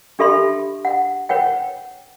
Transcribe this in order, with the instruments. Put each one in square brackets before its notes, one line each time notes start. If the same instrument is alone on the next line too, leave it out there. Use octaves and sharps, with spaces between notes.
[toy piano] D4 G4 A4 E5 B5 C6
F#5
B4 C#5 F#5 G5